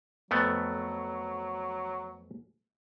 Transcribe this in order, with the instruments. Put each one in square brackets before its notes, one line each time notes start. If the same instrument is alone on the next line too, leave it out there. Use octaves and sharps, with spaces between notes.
[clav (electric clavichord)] F2 A3 B3 [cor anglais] F#3